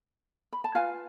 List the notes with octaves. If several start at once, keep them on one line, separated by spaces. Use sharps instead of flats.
B5
A5
F4 B4 F5 G#5